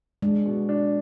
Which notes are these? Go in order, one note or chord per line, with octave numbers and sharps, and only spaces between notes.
G#3 D4
B2
D4